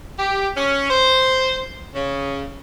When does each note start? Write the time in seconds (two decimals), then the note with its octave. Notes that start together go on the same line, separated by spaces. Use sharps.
0.18 G4
0.57 C#4
0.90 C5
1.95 C#3